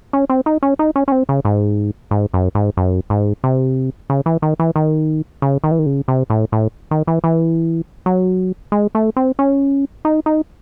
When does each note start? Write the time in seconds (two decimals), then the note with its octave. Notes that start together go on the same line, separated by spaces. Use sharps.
0.13 C#4
0.30 C4
0.46 D#4
0.63 C#4
0.79 D#4
0.96 C#4
1.08 C#4
1.12 C4
1.29 C#3
1.45 G#2
2.11 G#2
2.34 F#2
2.55 G#2
2.77 F#2
3.10 G#2
3.44 C3
4.10 C#3
4.26 E3
4.42 D#3
4.60 E3
4.76 D#3
5.42 C#3
5.64 D#3
5.71 E3
5.79 D#3
5.86 C#3
6.08 C3
6.30 A2
6.52 A2
6.91 D#3
7.07 E3
7.24 E3
8.06 F#3
8.72 G#3
8.95 A3
9.16 C4
9.39 C#4
10.05 D#4
10.26 D#4